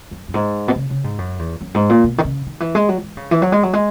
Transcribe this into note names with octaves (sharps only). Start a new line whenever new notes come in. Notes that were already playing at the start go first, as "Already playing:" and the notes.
F#2
F#2
G#2
B2
C#3
C#3
G#2
F#2
E2
F#2
G#2
A#2
B2
D#3
C#3
D#3
E3
G#3
F#3
E3
C#3
E3
F#3
G#3
F#3
G#3